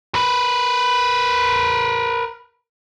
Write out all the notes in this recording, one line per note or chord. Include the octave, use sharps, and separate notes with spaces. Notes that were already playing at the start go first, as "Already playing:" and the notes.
A#4 B4